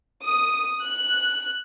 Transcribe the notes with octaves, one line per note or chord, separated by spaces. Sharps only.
D#6
F#6